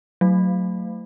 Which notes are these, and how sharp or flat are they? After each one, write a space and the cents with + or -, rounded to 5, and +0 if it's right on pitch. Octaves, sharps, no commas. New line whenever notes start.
F#3 -10 A3 +20